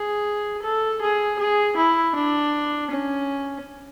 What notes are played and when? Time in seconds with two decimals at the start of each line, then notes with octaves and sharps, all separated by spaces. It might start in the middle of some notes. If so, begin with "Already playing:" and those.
Already playing: G#4
0.63 A4
1.01 G#4
1.39 G#4
1.76 E4
2.15 D4
2.91 C#4